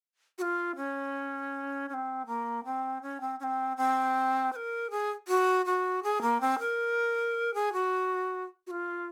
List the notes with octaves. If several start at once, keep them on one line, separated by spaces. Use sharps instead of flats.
F#4
F4
C#4
C#4
C4
A#3
C4
C#4
C4
C#4
C4
C4
C5
A#4
G#4
F#4
F#4
G#4
A#3
C4
A#4
G#4
F#4
F#4
F4